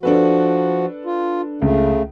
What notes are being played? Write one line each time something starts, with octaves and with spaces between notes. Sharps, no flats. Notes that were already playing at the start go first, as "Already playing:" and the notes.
F3 D4 F#4 A4 B4
F4
C#2 C#3 A3